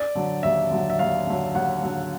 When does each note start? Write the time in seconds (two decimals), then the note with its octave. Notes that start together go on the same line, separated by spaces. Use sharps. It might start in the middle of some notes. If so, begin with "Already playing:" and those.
Already playing: D5
0.15 D3 F#3
0.43 D#2 E5
0.71 D3 F#3
0.90 E5
0.99 D#2 F5
1.27 D3 F#3
1.55 D#2 F#5
1.83 D3 F#3